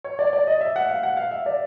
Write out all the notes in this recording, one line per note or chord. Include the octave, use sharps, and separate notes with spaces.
C#5
D5
D5
D#5
E5
F#5
F5
F#5
F5
E5
D5